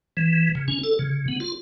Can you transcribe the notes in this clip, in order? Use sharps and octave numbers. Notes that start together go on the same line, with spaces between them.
E3
C#3
C#4
A4
C#3
B3
F4